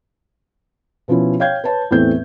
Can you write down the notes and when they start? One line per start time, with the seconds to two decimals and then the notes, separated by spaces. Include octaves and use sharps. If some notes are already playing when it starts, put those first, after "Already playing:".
1.08 B2 F3 C#4 E4
1.40 C#5 F5 G5 G6 G#6
1.64 B4 C#5 A5
1.91 E2 A2 A3 C4 G6